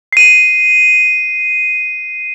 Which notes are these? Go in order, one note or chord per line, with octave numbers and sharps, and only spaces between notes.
C7 D#7